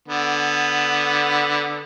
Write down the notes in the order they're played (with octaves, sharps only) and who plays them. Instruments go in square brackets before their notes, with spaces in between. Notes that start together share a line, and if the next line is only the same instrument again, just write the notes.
[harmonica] D3 B3